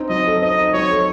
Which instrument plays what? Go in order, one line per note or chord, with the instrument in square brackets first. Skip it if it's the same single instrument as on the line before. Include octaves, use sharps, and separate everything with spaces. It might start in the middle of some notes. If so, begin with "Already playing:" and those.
Already playing: [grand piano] C4 D#4
[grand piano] F#3 [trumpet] D#5
[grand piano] A4
[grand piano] C4 [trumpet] D#5
[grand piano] D#4
[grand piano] F#3 [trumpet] C#5
[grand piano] A4